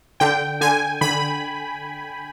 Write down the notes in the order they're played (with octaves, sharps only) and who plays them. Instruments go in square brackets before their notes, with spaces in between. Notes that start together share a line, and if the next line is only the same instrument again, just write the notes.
[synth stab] D3 G5
D3 G#5
D3 B5